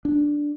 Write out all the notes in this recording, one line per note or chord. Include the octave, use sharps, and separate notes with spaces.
D4